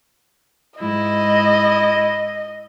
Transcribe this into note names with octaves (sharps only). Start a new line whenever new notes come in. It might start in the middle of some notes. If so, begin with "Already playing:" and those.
G#2 E4 D#5